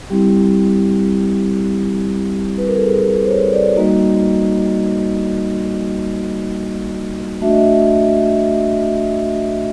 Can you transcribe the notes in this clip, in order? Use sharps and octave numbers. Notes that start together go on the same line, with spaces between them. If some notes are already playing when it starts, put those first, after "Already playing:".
G3 C4 E4 G4
B4
A#4
A4
G#4
C5
C#5
D5
G3 A#3 D#4 F#4 D#5
A3 D4 F#4 E5
D#5
E5